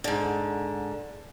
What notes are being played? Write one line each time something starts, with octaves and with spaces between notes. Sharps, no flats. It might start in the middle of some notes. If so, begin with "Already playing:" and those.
G#2 D3